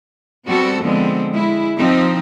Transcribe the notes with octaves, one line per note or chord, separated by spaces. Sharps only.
G3 B3 C4 F#4 A4
D3 F3 G#3 B3 C4
G#3 E4
F3 C4 D#4